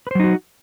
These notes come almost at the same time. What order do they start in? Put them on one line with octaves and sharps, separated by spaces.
B4 C5 F#3 D#4 F#4